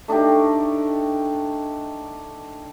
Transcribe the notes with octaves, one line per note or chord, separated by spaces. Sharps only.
A3 D4 D#4 G4